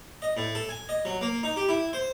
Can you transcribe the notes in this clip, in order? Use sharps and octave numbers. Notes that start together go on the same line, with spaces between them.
D#5
A2
A4
G#5
D#5
F#3
A#3
D#4
G4
E4
C5